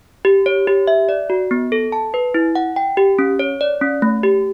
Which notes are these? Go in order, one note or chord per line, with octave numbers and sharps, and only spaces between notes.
G4
C#5
G4
E5
D5
F#4
B3
A4
A5
B4
E4
F#5
G5
G4
C#4
C#5
D5
C#4
A3
G4